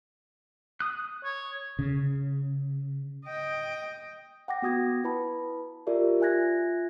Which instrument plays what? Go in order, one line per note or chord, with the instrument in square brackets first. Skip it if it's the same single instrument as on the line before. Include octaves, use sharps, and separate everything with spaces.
[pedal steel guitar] D#6 F#6
[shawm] C#5
[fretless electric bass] C#3
[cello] D#5 G5
[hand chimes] F#5 G5 D6 A#6
B3 F#4 D#6 G#6 A#6
E4 B4 A5 B5
F4 G4 A#4 D5 E5
F4 E5 G#5 F#6 G#6 A#6